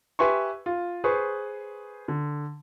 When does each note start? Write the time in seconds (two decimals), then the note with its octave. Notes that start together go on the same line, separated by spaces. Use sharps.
0.19 G4 B4 E5 G#5 C6 C#6
0.66 F4
1.04 G#4 B4 C5 C#6
2.08 D3